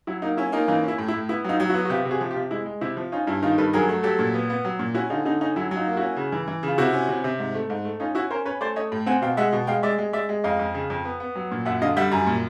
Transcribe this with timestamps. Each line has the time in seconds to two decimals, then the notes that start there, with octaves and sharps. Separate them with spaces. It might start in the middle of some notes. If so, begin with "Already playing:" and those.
0.07 F#3 E4
0.22 A#3 D#4
0.37 C#4 E4
0.52 A#3 D#4 F4
0.68 E3 D#4 F4
0.83 C#4
0.88 E4
0.98 A2
1.08 E4
1.14 A2
1.29 B3 E4
1.44 F#3 D#4 F4
1.60 F#3
1.70 E4 F#4
1.74 B3
1.85 F#4
1.90 C3 F4 G4
2.05 C3
2.11 F#4 G#4
2.21 F3
2.31 F4 G4
2.36 C3
2.51 G#3 E4
2.66 G#3
2.81 C3 E4
2.97 F3
3.12 C#4 D#4 F4
3.27 G2 E4
3.42 D#3 D#4 F4
3.58 G2 A4 B4
3.73 F#3 G#4 A#4
3.89 A3
4.03 F#3 G4 A4
4.19 A#2
4.34 B3
4.50 B3
4.65 F#3
4.79 A#2
4.94 C#4 E4 F#4
5.10 D3 D#4 F4
5.25 D3 D#4
5.41 C#4 D#4
5.56 F#3 E4
5.71 F#3
5.76 D#4 F4
5.87 A#3
5.93 F4
5.97 C#4 E4 F#4
6.16 C#3
6.32 E3
6.48 E3
6.63 C#3 F4
6.78 C3 E4 F#4
6.93 C#4
7.09 C3
7.24 C3
7.39 G#2
7.54 A3
7.70 G#2
7.85 A3
8.00 C#4 D#4 F4
8.15 C#4 E4 F#4
8.30 C#4 A#4 C5
8.46 C#4 B4 C#5
8.61 A3 C5 D5
8.76 A3 C#5 D#5
8.92 A2
9.06 C4 F#5 G#5
9.22 B2 F5 G5
9.37 G#3 E5 F#5
9.53 B2
9.67 G#3 F5 G5
9.83 G#3 D5 E5
9.98 G#3
10.13 G#3 D5 E5
10.29 G#3
10.44 F2 D#5 F5
10.59 F2
10.74 C#3
10.90 F2
11.05 B3
11.20 B3
11.35 F#3
11.51 A#2
11.65 F#2 E5 F#5
11.82 D3 D#5 F5
11.96 G3 E5 F#5
12.12 F#2 G#5 A#5
12.27 A#2